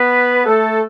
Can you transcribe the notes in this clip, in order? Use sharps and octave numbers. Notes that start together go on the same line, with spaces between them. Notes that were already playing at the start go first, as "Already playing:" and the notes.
Already playing: B3 B4
A3 A4